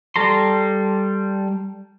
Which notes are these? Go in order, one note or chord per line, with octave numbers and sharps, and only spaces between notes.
G3 A4 A#5 C6